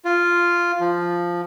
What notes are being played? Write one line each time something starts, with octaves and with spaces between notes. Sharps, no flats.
F4
F3